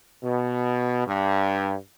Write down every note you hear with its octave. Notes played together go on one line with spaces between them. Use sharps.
B2
G2